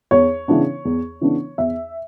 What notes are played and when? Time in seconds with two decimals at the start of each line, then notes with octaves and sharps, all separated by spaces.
0.11 E2 C#5
0.48 C#3 E3 B3 D4
0.85 E2
1.21 C#3 E3 B3 D4
1.58 E2 E5